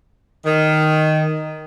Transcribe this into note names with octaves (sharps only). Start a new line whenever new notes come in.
D#3